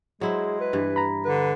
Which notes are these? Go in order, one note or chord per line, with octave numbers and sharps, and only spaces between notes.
F#3 G#3 E4 G#4 C5
B4
G2 E3
A#5 B5
D3 B4